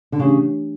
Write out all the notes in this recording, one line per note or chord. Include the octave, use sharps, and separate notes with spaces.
D3
C#3 E3 A3 D4 G4 C#5